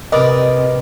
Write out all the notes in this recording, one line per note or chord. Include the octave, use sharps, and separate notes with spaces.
C3 A#4 B4 D5 D#5